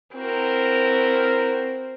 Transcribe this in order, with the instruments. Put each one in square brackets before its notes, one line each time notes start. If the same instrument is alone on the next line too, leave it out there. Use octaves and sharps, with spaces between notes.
[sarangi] C4 [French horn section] E4 F#4 A#4